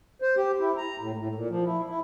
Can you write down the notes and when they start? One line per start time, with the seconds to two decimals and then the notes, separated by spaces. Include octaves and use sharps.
0.22 C5
0.37 G4
0.60 E4
0.77 A#5
1.00 A2
1.17 A2
1.35 A#2
1.50 F3
1.66 E4
1.89 E4